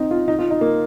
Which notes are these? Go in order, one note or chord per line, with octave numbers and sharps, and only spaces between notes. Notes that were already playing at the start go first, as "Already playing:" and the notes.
Already playing: C4 D#4
F4
D#4
F4
D#4
A#3